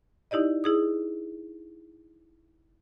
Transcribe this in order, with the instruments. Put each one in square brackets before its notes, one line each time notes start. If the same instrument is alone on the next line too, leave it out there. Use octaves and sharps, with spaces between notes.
[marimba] D#4 E4 G4 D5 D#5
E4 G#4 D#6